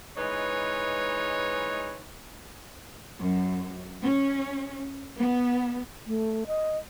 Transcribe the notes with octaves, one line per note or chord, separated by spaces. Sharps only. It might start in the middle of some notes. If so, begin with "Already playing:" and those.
E3 G#3 D#4 B4 C#5
F#2
C#4
B3
A3
D#5